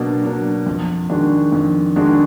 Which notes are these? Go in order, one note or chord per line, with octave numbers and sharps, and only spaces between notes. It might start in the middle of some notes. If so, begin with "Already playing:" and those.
Already playing: B2 F#3 A#3 D4
F#3 A#3 D4
F2
D#3 G#3 D4 F#4
F2
D#3 G#3 D4 F#4